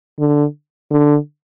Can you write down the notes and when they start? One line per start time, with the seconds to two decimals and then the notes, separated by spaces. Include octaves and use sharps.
0.19 D3
0.91 D3